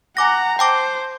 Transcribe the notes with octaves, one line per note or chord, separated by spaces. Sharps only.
F#5 G#5 A#5 D6 A#6
C5 G5 A5 D6